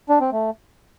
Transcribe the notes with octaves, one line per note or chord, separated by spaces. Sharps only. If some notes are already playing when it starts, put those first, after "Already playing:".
D4
C4
A3